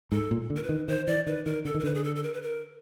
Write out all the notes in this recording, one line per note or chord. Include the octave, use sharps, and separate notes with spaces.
G#2 A4
A#2
D3
A#4
B4
D#3
D#3 C5
E3 D5
D#3 B4
D#3 A#4
D3 A4
D#3
A#4
D3 B4
G#4
A4
A4
A#4
B4
A#4